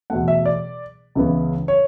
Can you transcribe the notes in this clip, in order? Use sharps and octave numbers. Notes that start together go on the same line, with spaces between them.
E2 B2 A3 F#5
E5
D5
C#2 C#3 E3 B3
C#5